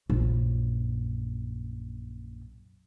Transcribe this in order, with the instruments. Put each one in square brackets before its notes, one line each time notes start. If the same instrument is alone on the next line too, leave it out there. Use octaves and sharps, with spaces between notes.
[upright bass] A#1 F#2